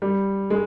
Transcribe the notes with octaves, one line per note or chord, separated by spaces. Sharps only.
G3
G#3